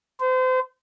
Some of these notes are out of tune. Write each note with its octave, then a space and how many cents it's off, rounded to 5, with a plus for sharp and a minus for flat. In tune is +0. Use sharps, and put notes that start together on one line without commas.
C5 -35